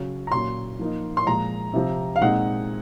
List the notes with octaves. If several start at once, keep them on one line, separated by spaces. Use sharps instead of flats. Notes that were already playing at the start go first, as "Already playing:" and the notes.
Already playing: C#3 F#3 C#4
A#5
A#2 F#3 C#4 C6
F3 A#3 D#4
C6
A#2 F3 G#3 A#5
C3 F3 C4
F5
A#2 G#3 C4 D#4 F#5